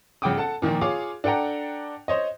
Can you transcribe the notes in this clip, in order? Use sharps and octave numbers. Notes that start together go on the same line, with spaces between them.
G1 C#3 F#5 G5 D6 D#6
A4 F#5 A5
A#2 D#3 F3 A#3
F4 G#4 C#5 F5 D6
D4 A4 F#5 G5 A#5
C5 C#5 D#5